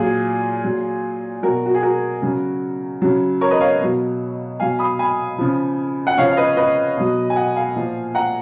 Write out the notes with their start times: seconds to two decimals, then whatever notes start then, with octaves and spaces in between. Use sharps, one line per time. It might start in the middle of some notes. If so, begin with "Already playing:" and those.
Already playing: A#2 F#3 F4 G#4
0.64 A#2 F#3
1.43 B2 F#3 F#4 A#4
1.66 F#4
1.74 G#4
1.82 F#4 A#4
2.22 C#3 F#3
3.02 C#3 F#3
3.41 A#4 C#5
3.51 B4 D#5
3.61 C#5 F5
3.80 B2 F#3
4.60 B2 F#3 F5 G#5
4.79 B5 D#6
4.99 G#5 B5
5.38 C#3 F3
6.07 F#5
6.17 C#3 F3 C#5 F5
6.32 F5
6.37 B4 D#5
6.57 B4 D#5
6.97 B2 F#3
7.30 G#5
7.36 D#5 F#5
7.56 F5 G#5
7.76 A#2 F3
8.15 F#5 A#5